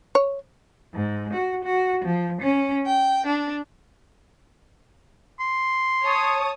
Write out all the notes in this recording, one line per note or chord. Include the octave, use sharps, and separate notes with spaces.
C#5
G#2
F#4
F#4
F3
C#4
G5
D4
C6
C#5 A5 D#6